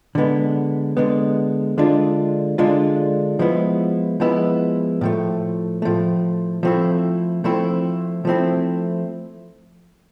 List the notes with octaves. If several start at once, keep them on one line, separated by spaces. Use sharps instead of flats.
D3 G#3 B3
D3 G#3 B3
D3 G#3 D4 F4
D3 G#3 D4 F4
F3 G#3 B3 E4
F3 G#3 B3 E4
A2 F3 A3
A2 F3 A3
F3 A3 C4 E4
F3 A3 C4 E4
F3 A3 C4 E4